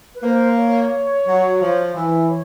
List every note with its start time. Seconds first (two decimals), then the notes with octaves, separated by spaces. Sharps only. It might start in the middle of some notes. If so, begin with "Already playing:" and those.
0.15 B4
0.23 A#3 C5
0.57 C#5
1.27 F#3
1.60 F3
1.95 E3
2.29 C#5